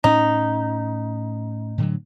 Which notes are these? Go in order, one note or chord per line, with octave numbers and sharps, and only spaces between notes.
A2 C#4 D#4
A2 D3 F#3